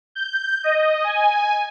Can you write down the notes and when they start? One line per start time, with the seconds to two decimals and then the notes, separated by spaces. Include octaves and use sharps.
0.15 G6
0.64 D#5
1.04 G#5